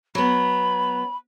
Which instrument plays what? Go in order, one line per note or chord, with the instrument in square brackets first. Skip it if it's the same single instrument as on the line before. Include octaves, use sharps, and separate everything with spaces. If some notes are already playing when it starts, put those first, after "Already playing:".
[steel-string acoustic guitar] F#3 B3 [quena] B5